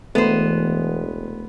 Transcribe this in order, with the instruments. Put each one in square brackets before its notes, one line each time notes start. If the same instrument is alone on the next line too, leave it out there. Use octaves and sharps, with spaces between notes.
[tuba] E1 [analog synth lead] E3 [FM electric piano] A3 [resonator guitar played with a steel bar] B3 C5